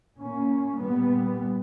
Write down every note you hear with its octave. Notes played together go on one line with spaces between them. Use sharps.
A#2 A#3 C#4
A#2 G3 B3